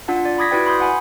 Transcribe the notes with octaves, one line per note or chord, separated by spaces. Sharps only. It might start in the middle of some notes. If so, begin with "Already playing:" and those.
D4 F4 F#5 A5
D5
B5 D6 D#6 G#6 A#6 B6
E4 F#4 B4 D5 G5
B5 C6 D#6 G6
F#5 G#5 B5